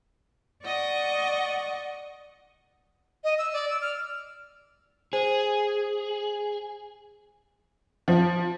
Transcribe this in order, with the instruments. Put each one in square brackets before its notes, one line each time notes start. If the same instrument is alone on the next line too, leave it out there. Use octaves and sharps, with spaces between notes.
[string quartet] D5 D#5 F#5 C#6
[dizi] D#5
E6
D5
E6
F6
[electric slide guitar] G#4 [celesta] C5
[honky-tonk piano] F3